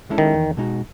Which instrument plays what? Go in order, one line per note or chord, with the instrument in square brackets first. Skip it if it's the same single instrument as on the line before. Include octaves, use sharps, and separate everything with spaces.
[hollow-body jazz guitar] G#3 C#4 E4 A4
[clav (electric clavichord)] D#3
[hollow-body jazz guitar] E2
B2 G#3 D#4 F#4